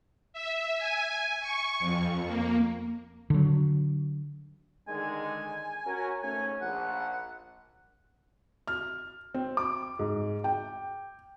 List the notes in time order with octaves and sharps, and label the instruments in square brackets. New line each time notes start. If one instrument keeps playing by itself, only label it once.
[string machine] E5
G#5
C#6
F2
A#3
[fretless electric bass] D3 F#3
[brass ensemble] D3 D#3 G#3 [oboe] G#5
[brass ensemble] C#4 F#4 A#4
[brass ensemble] G#2 A3 C#4 [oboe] G#5
[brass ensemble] A#1 [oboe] F#5
[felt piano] F6
C4
D6
G#2
G5